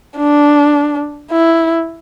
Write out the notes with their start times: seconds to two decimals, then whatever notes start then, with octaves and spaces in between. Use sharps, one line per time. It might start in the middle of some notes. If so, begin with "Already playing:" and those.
0.17 D4
1.31 E4